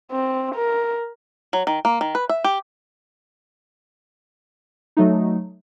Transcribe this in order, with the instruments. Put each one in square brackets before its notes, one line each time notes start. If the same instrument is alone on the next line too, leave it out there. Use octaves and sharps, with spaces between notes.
[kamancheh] C4
A#4
[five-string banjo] F#3
D#3
A#3
D#3
B4
E5
G4
[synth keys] F#3 A3 D#4